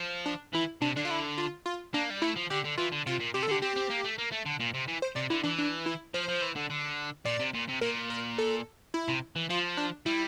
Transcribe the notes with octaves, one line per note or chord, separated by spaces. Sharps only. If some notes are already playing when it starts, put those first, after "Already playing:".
Already playing: F3
D4
E3 E4
C3 D4
D3 D4
F4
E4
F4
F4
A#3 D4
G3
A3 E4
F3
D3 G4
D3
E3 F4
D3
C3 F4
A#2
C3 G4
A4
D3 G4
C4 G4
C4
A#3
A3
A#3
A3
D3
A#2
C3
E3
C5
C3 D5
D3 E4
E3 D4
D4
E4
F3 C5
F3
E3
D3
D3
A#2 D5
C3
A#2
C3
A#2 A#4
A#4
A4
E4
C3
E3
F3 F4
D4
G3 E4